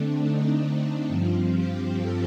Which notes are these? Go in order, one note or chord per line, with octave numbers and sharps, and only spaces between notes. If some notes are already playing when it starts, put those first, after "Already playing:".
Already playing: D3 A3 C4 D4
D#4
G2 F3 C4 F4
G4
A4